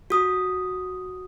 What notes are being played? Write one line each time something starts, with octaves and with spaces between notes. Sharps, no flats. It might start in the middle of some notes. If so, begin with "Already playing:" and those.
F#4 D#6